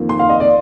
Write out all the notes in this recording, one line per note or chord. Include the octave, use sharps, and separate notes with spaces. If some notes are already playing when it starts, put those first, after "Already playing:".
Already playing: F2 D#3 A#3
C6
F5
D#5
D5